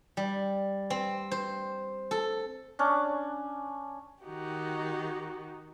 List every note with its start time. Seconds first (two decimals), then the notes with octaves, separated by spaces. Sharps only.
0.17 G3
0.90 C4
1.31 C5
2.11 A4
2.79 C#4 D4
4.23 D#3 D#4 F#4 G4